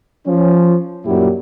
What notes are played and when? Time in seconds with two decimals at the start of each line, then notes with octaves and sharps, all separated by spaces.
0.26 F3 C#4
1.05 F#2 A#2 F#3 G3 E4 G4